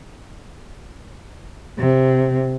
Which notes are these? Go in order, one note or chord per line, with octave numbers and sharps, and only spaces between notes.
C3